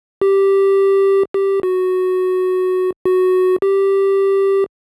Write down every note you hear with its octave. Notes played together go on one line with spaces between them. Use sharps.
G4
G4
F#4
F#4
G4